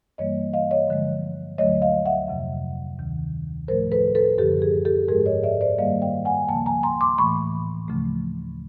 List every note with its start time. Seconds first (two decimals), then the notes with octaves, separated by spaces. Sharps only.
0.18 G2 E3 G3 A#3 C#5 D#5
0.53 D#5 F5
0.71 C#5 D#5
0.89 G2 D3 F3 G#3
1.58 D2 D3 F#3 A3 C#5 D#5
1.82 D#5 F5
2.06 E5 F#5
2.28 F2 C3 F3
2.99 D2 C3 D#3
3.68 A2 F3 A3 A#4 C5
3.92 A4 B4
4.15 A4 B4
4.38 F#2 D3 F3 G4 A4
4.62 G#4
4.85 G4 A4
5.08 G#2 F3 G#3 G#4 A#4
5.26 C#5 D#5
5.44 D5 E5
5.61 C5 D5
5.78 G2 D#3 G3 A#3 D#5 F5
6.02 F5 G5
6.25 F#5 G#5
6.48 D2 C#3 F3 A#3 G5 A5
6.66 G#5 A#5
6.83 A#5 C6
7.01 C6 D6
7.18 A2 E3 A3 B5 C#6
7.88 D2 C#3 F3 A3